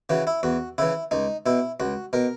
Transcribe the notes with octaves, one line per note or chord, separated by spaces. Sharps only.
C#3 E3 F#4
E4
E2 F#4
C#3 E3 E4
C#2 D#4
B2 E4
C#2 F#4
B2 A#4